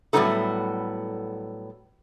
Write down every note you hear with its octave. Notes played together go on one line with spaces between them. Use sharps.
A2 F#3 G3 B3 D#4 A4